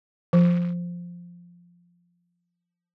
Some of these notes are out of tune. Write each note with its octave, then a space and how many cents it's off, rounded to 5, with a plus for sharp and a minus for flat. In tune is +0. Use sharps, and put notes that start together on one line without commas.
F3 +0